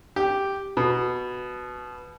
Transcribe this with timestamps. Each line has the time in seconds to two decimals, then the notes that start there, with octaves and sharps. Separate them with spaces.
0.16 G4
0.77 B2